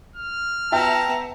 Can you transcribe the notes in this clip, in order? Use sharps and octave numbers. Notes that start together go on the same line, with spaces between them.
F6
B3 E5 G5 A5 A#5